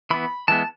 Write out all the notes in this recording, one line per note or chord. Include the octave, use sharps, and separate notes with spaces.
E3 B3 B5
E3 G#3 B3 A5